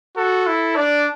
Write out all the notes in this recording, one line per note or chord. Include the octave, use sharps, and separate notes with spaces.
F#4 A4
E4
D4 D5